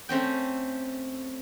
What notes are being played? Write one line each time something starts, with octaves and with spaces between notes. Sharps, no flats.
A3 C4 C#4 G5